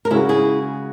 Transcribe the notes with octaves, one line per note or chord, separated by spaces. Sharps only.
A#4
C#3 G#3 C#4 E4 F#4 G#4
E4 G#4